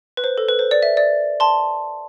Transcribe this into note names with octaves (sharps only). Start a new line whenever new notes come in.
B4
C5
A4
B4
C5
D5
E5
D5
A5 C6